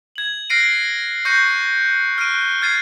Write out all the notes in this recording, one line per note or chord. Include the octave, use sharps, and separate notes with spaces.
G#6 F#7
F6 F#6 A#6 C7 D7 D#7
C#6 F#6 G6 A#6 C7 C#7
F6 F#6 D7 D#7
F6 G#6 A6 C7 D#7